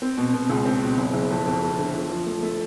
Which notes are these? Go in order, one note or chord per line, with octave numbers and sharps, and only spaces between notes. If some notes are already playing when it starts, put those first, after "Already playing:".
C4
B2
B2
C#2
C4
B2
F#1
F#1
F2
F2
F2
D3
F3
F3
A3
A3